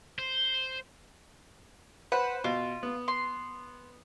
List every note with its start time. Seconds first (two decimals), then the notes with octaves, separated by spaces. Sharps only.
0.19 C5
2.12 B4 C5 F#5
2.44 B2 F4
2.83 B3
3.08 C6